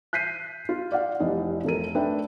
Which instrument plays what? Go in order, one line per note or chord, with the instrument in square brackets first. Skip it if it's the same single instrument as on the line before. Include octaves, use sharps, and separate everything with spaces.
[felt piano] F#6 G6 B6 C7 D#7
F4
D5 F5 F#5
F1 E4 G4 D#5
F1 A4 A#4 D#7
A3 D4 B4 E5 G5